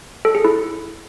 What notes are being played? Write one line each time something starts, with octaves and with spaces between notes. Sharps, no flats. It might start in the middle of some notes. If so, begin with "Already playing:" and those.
A4
G#4
E4